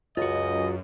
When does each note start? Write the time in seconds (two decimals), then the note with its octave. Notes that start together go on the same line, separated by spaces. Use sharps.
0.17 C#2 F#2 F4 F#4 D#5